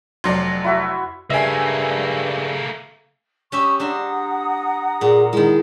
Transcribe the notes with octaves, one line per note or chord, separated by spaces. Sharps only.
F1 F#3 C5 D5
E4 F#4 E5
G2 C#3 A3 A#3 E5 G#5
C#4 G4 E5 C#6 D#6
D4 C5 E5 F#5 A#5 D#6
A#2 G#4
D#3 G#3 E4